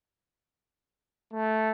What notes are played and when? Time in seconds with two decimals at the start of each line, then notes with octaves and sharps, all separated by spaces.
1.32 A3